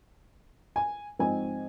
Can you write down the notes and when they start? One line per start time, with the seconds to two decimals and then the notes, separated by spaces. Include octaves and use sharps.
0.76 G#5
1.19 G#2 F3 C4 D#4 G#5